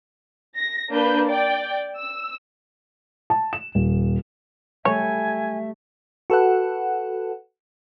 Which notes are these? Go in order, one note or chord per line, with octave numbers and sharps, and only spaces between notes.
A#6
A#3 D4 B4 G6
D5 G5
E6
A5
E7
D#1
G3 A3 C#5 E5 G#5
F#4 A4 B4 F#5